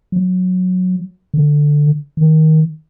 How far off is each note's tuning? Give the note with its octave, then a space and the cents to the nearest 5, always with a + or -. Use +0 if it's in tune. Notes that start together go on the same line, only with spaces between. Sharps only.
F#3 -15
D3 +5
D#3 +15